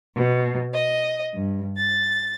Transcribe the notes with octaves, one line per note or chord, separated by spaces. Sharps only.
B2
D#5
G2
A6